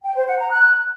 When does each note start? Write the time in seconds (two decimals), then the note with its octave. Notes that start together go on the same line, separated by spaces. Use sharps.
0.04 G5
0.15 C5
0.27 F#5
0.39 A#5
0.51 F#6